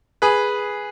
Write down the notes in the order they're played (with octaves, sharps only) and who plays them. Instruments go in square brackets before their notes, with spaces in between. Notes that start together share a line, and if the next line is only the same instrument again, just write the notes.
[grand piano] G#4 B4